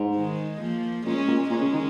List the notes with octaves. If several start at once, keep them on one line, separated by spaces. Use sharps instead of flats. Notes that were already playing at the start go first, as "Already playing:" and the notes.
Already playing: G#2
D#3 G#3
F3 A#3
A#2 G#3 C#4
A#2
A#2 G#3 C#4
C#3
D#3